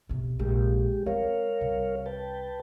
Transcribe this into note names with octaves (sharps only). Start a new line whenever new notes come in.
B1 C3
A#1 G#3 G4
G#3 C4 A#4 C#5 F5
C2
B4 G5 A5